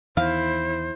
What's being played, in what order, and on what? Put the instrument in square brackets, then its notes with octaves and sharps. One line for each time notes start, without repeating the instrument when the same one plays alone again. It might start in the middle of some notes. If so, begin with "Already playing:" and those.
[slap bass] E2 D#3 [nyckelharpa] E4 [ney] C5 [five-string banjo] F5